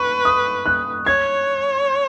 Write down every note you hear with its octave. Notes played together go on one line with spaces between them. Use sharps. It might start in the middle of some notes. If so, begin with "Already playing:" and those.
Already playing: B4 C#6
D#6
F#6
C#5 G#6